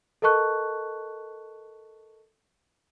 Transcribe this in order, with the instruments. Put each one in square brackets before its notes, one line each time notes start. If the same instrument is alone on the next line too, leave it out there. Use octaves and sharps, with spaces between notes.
[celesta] A4 A#4 D#5 A5 C#6 F#6